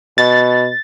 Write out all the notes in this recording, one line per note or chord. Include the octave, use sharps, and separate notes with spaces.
B2 A6